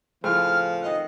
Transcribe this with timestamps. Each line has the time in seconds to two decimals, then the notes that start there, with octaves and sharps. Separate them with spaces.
0.24 A2 C#3 F3 C4 F6
0.82 D#3 D#5 F5 F#5